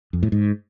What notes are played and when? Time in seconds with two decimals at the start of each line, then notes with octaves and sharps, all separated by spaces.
0.13 F2
0.23 A2
0.32 G#2